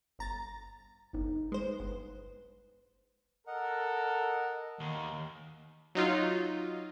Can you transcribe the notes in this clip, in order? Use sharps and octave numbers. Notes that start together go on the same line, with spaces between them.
G1 A#5 A6
G1 D#4
G#3 B4 C5
G1
A4 A#4 D#5 F#5
D#2
F#3 D#4 F4